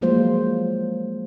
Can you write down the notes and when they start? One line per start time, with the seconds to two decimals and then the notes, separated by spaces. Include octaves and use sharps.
0.01 F3 F#3 G#3 A#3 F4 C5